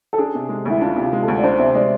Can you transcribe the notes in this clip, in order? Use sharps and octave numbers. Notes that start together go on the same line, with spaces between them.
A4
D4 G#4
C3
G#3
D2 E4
D4 F4
C3
F4
G#3
A4
D2
D5
D4 C5
C3 E5
G#3 D5